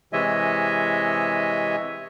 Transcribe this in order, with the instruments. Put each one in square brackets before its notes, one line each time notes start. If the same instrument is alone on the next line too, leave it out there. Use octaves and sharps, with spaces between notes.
[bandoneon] C3 E3 G#3 C#5 D#5 E5